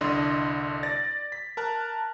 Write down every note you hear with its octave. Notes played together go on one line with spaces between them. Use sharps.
C2 D3 D4 E4 D#5 C6
D5 A6 A#6
B6
A#4 A5 F#6